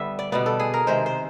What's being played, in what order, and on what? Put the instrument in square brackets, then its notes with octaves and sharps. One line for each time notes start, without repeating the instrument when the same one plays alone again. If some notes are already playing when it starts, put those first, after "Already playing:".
Already playing: [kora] D3 G3 B3 E5
D5
B2 G3 B3 D5
A4
G#4
A#4
C3 D#3 G#3 C5
C5